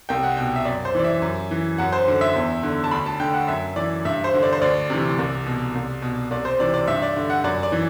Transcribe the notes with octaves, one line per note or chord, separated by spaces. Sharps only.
C2 G5
F#5
B2 G5
E5
F#2 D5
C5
E3 D5
E5
F#2
E3
F#2 F#5
C5
D3
E5
E2
D3
A5
D2 B5
A5
D3 G5
F#5
F#2 E5
E3 D5
G2 E5
C5
D3
D5
C5
D2 D5
C3 E3
C2
B2
C2
B2
C2 D5
C5
C3 E3 D5
D5
G2 E5
D5
D3
F#5
F#2 D5
D5
E3